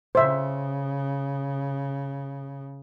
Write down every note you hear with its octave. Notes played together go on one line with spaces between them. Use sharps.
C#3 C5 E5